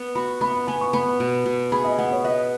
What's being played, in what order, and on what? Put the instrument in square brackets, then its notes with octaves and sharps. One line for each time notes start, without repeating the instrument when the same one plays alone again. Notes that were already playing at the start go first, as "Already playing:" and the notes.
Already playing: [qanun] B3
[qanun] F#4 [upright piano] B5
[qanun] B3 [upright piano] B5
[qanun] B3 [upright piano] G#5
[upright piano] C#6
[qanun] B3 [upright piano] B5
[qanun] B2
B2
[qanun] G#4 [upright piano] B5
[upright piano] D#5
[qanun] B3 [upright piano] F#5
[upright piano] C#5
[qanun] B4 [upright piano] D#5